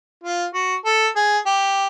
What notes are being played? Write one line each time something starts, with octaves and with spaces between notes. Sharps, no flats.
F4
F#4
A4
G#4
G4